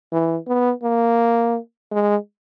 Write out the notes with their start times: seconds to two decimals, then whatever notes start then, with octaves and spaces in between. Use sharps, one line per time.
0.12 E3
0.47 B3
0.83 A#3
1.91 G#3